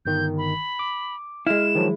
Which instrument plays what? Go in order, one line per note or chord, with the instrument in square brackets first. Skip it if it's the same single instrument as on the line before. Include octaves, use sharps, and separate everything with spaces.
[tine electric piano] G1 D#3 [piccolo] G6
[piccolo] B5
[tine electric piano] D6
[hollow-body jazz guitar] G#3 E4 [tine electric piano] F6 [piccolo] E7
[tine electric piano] D#3 F3 F#3